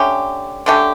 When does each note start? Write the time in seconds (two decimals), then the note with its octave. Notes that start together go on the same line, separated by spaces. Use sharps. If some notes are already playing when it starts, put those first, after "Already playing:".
Already playing: D3 A3 C#4 G4
0.66 D3 A3 C#4 G4